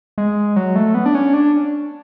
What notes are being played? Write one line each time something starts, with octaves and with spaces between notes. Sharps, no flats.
G#3
F#3
A3
B3
D4
C#4
D4